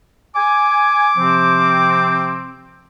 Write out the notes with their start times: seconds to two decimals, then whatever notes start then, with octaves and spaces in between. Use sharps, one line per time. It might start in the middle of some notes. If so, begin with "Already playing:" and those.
0.35 G#5 D6
1.17 C3 F3 C4